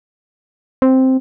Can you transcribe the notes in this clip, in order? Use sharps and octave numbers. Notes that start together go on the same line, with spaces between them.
C4